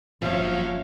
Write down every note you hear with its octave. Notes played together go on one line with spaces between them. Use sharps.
F#1 F#2 F3 C#5 E5 F5